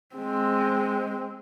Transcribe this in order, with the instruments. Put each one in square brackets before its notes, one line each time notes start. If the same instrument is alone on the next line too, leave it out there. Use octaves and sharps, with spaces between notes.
[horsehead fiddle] G#3 C4